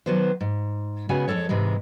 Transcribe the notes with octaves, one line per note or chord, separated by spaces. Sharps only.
D#3 F#3 B3 F#4 C5
G#2
C#3 G#3 B3 F#4 F#5 G#5
F2 E3 G#3 A4 C#5
G#2 C3 E3 G#3